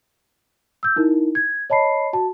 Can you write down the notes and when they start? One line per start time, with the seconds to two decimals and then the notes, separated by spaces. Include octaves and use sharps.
0.83 E6 G6
0.96 D#4 E4 A#4
1.35 G#6
1.70 C#5 D#5 A5 B5 C7
2.13 F#4 A5